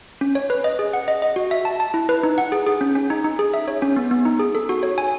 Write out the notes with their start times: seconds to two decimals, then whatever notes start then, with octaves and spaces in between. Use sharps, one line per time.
0.21 C#4
0.35 C#5
0.50 B4
0.64 D#5
0.79 G#4
0.93 F#5
1.08 D#5
1.22 D#5
1.36 F#4
1.51 E5
1.65 A5
1.80 A5
1.94 E4
2.09 B4
2.23 D#4
2.38 F#5
2.52 G#4
2.67 G#4
2.81 C#4
2.95 C#4
3.10 D#4
3.24 D#4
3.39 G#4
3.54 E5
3.68 C#5
3.82 C#4
3.96 B3
4.11 B3
4.25 D#4
4.39 G#4
4.55 A4
4.69 F#4
4.83 C#5
4.98 G#5